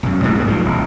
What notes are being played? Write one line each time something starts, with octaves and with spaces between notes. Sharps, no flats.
B1 F#2
C#2 A2 G3 A#3
G#2 A#3
B1 F3
D#1